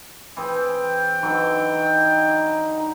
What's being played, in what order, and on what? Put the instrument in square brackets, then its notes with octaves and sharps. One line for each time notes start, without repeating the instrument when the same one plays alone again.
[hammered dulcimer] E3 C4 G#4 [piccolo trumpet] G5
[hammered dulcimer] D3 E3 F#3 [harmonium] D#4